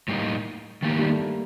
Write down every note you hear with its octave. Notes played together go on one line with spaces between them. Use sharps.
A2 G3 A#3 D#4
D#3 A3 A#3 D#4 G4
G3
A3
A#3